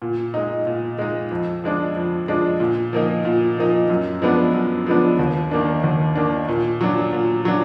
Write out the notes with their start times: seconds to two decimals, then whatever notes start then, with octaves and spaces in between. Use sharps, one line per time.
0.02 A#2
0.34 G#3 D#4
0.67 A#2
0.98 G#3 D#4
1.31 F2
1.64 F3 G#3 D4
1.96 F2
2.28 F3 G#3 D4
2.60 A#2
2.93 F3 A#3 D#4
3.25 A#2
3.58 F3 A#3 D#4
3.90 F#2
4.22 F3 G#3 B3 D4
4.54 F#2
4.87 F3 G#3 B3 D4
5.19 D#2
5.51 D#3 A#3 D4
5.84 D#2
6.15 D#3 A#3 D4
6.48 A#2
6.81 F#3 D4
7.13 A#2
7.45 F#3 D4